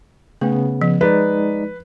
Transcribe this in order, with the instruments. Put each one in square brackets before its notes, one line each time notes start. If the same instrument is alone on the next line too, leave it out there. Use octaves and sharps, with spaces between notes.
[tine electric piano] C#3 B3 [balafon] A3
[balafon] F3
[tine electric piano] G#3 D#4 D5 [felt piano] B4